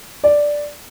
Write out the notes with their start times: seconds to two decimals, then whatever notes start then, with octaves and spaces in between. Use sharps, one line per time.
0.24 D5